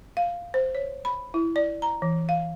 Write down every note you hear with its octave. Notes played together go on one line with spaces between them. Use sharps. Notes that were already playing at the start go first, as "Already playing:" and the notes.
F5
C5
C#5
B5
E4
D5
A#5
E3
F5